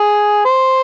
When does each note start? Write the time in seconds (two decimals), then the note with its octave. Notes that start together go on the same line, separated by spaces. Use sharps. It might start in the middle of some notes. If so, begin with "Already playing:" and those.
Already playing: G#4
0.45 C5